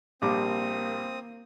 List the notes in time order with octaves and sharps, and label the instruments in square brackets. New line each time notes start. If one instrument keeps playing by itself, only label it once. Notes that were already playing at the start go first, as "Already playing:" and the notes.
[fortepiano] A#1 G3 D6 [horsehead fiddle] A#3 [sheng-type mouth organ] C4 D#6